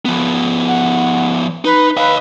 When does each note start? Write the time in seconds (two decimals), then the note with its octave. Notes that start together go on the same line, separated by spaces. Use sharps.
0.05 F3 B3
0.67 F#5
1.65 D#4 B4
1.97 B4 D#5 F5